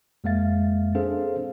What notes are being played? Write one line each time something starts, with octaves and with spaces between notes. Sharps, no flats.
F2 G#3 A#3 E5 F5 A6
C4 D4 G#4 A4 C5 F5